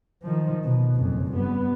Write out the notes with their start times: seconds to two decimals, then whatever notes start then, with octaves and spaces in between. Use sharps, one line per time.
0.22 D#3 F3
0.64 B2
0.95 F#1 F2
1.32 G2 B3